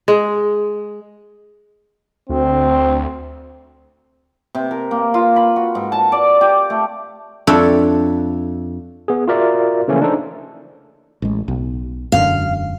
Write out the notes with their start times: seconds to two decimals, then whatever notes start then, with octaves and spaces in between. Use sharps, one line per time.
0.08 G#3
2.29 D2 C4
4.55 C3
4.71 A#4
4.91 A#3
5.14 F4
5.36 B5
5.56 F#4
5.75 G#2
5.92 A5
6.12 D5
6.41 G4
6.70 A3
7.47 F2 D4 A4 C#5 E5 G5
9.08 B3 G#4
9.28 F4 F#4 A#4 D5 E5
9.88 C#3 E3 F3 A3 A#3 C#4
10.01 D4 D#4 A4 C5
11.22 A1 G#3
11.48 B1
12.12 E1 F#2 D3 F5